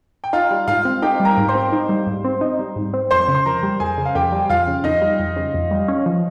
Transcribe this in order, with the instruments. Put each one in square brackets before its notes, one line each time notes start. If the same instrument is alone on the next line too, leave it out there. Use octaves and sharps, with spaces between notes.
[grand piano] G5
[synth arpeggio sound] D#4 [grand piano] F4 F5
[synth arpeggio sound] G3
[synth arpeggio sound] G#2 [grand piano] F4 F5
[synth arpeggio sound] C4
[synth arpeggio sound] D#4 [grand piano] G4 G5
[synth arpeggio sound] G3
[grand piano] A#4 A#5
[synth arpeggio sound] G#2
[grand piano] C5 C6
[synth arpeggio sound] C4
D#4
G3
G#2
C4
D#4
G3
G#2
C4
[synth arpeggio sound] F2 [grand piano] C5 C6
[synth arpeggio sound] C#3
[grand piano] C6
[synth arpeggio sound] F2 [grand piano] A#4 A#5
[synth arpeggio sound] G3
[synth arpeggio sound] F2 [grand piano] G#4 G#5
[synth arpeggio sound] C#3
[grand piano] F5
[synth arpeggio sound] F2 [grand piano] G4 G5
[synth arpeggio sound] G3
[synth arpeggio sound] F2 [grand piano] F4 F5
[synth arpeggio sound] C#3
[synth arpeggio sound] F2 [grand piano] D#4 D#5
[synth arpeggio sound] G3
F2
C#3
F2
G3
C#4
F3